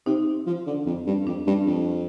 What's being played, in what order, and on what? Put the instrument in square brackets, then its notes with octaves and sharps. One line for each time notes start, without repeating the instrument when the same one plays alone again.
[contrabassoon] C3 [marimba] D#4
[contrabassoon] F3
D3
F2
G2
[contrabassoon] F2 [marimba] D4
[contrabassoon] G2
F2